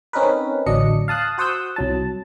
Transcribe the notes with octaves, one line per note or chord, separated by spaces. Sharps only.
C4 C#4 D#4 A#4 B4
A1 D2 F#3 D4 D#5 C#7
F5 A5 D#6 F#6
F#4 C5 F#5 D#6 E6 G6
C2 F#3 A5